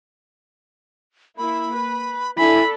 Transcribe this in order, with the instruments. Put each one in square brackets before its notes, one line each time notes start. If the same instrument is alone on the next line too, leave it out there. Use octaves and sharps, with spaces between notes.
[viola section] A#3 E4 [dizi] B5
[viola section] B4
[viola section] D4 A4 [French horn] E4 [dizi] G#5 [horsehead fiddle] B5